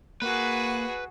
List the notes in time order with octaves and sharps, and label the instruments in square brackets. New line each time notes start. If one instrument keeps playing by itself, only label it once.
[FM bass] A#3 [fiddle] F#4 G#4 [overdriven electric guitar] B4